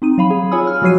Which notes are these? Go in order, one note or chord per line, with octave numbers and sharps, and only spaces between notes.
C4 D#4 D#7
F#3 F5 B5
G#4
F4 C#5 G#5 B5 D#6 E6
F6
F3 F#3 F#4 C#5 C7 D#7